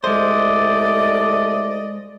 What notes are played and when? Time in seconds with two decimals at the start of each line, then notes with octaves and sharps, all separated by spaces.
0.04 C2 G#2 G#3 A3 C5 D5 D#5